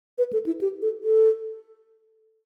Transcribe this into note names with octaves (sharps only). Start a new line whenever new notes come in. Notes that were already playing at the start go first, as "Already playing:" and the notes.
B4
A4
E4
G4
A4
A4